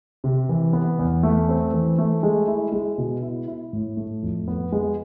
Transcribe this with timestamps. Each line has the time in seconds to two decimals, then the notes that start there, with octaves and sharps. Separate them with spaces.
0.24 C3
0.49 E3
0.73 B3
0.99 E2
1.23 A3
1.49 C4
1.73 E3
1.98 A3
2.23 G#3
2.47 E4
2.72 G#3
2.98 B2
3.22 E4
3.47 E4
3.73 A2
3.97 A3
4.23 F2
4.48 B3
4.72 G#3